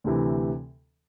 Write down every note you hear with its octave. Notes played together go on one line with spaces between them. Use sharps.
D2 C3 E3